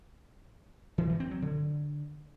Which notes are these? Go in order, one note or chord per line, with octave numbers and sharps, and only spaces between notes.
E3
G2
C4
F#3
D3